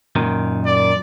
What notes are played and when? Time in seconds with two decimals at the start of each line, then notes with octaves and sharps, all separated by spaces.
0.16 F#2 A#2 D#3
0.65 D5